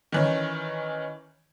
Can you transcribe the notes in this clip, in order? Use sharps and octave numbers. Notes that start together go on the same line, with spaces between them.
D#3 E3 C#4